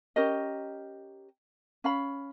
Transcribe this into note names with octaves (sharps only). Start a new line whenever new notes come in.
C#4 G4 A#4 D#5
C#4 F5 B5